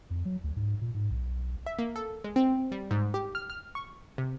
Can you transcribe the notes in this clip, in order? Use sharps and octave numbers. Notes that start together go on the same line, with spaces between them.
F2
F#3
D2
G#2
A#2
G#2
B1
E5
A#3
A4
G#3
C4
G3
G#2
G4
F6
F6
C#6
C3